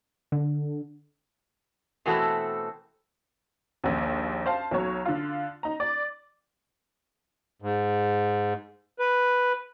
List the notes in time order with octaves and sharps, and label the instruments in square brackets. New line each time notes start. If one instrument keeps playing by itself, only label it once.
[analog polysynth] D3
[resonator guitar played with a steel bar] B2 E3 A3 C4 F#4 A4
[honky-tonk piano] A#1 D#2
C5 F5 A5
B1 F#3 C#5
D3 F4
D#4 A#5
D5
[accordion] G#2
B4